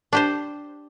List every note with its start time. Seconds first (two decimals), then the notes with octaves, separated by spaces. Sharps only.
0.13 D4 G4 C5